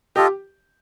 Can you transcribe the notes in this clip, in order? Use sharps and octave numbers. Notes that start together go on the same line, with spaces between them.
F4 G4 A4 D#5